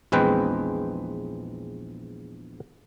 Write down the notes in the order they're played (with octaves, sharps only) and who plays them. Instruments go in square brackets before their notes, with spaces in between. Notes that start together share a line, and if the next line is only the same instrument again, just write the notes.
[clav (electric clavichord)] A#1 E2 G#3 C4 B4 G5